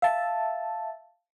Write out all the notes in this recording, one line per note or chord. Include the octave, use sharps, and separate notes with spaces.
E5 F5 A5